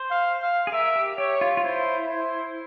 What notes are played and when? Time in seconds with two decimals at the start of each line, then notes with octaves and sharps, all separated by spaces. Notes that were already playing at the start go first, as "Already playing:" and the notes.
Already playing: C5
0.11 F5
0.42 F5
0.67 G#4
0.72 A#4 E5
0.96 G4
1.18 G4 C#5
1.41 F4
1.57 F4
1.64 E4 C5
2.09 C5